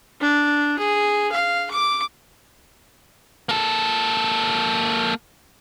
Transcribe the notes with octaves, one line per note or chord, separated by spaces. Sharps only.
D4
G#4
F5
D6
A#3 A4